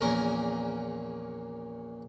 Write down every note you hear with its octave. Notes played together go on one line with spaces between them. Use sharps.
A#1 E2 A#2 C#4 A#4